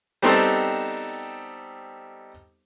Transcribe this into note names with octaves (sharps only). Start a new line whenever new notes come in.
G3 B3 C4 D#4 A4 C5